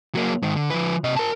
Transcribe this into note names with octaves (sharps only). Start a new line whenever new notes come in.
F#3 A#3
G#2 D#3
D3
F3 B4
C3 D#5
A#4 A5